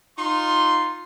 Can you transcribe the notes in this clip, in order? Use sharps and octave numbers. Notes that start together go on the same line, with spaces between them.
D#4 F4 C6